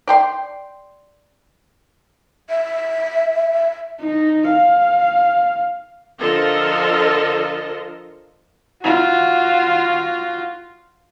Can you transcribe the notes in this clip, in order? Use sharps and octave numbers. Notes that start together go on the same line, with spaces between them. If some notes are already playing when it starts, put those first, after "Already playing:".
D5 G5 C6
E5
D#4
F5
D3 F3 F4 A4 A#4 D#5
F4 F#4